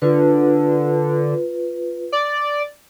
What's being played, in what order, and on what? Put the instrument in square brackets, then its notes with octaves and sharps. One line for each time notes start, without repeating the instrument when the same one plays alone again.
[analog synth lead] D3 [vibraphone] F4 B4
[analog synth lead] D5